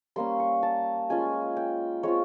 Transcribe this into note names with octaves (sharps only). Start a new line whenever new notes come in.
G3 A#3 C#4 C6
C#6
A5
G#3 C#4 F4 G#5
G5
G#3 C4 F4 C#5